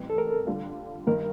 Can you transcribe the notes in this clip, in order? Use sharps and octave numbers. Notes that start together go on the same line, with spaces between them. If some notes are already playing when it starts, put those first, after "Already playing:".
Already playing: A1 A2 G3 C4
A4
A#4
D3 G3 D4 F4
G2 D#3 A#3 A#4